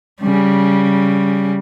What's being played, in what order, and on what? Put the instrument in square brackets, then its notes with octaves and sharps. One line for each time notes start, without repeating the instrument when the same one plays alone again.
[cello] C#3 G3